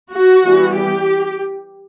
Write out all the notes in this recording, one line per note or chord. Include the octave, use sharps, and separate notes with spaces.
F#4
E3 G3 B3
G4